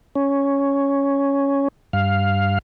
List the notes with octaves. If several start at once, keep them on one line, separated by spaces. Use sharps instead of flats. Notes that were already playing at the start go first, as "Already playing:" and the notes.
C#4
G2 F5